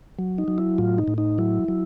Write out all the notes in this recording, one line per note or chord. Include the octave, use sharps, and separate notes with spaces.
F#3
D#4
F#3
E4
A2 F4
D#4
A2
D#4
F#3 E4
F#3